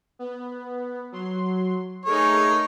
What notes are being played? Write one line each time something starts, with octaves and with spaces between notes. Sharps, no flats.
B3
F#3 C6
A3 D#4 G#4 A#4 C#5